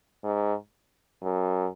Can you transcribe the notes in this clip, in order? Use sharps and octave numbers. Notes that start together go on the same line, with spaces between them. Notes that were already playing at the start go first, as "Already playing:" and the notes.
G#2
F#2